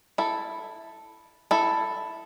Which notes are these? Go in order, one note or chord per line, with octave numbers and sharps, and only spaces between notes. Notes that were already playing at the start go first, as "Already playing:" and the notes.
E4 A4
E4 A4